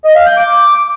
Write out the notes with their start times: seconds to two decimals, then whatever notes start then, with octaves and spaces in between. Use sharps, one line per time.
0.05 D#5
0.15 F5
0.26 G6
0.37 D6